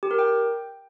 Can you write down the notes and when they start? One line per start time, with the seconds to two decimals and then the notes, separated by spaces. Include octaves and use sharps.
0.03 G4
0.11 A#4
0.19 G5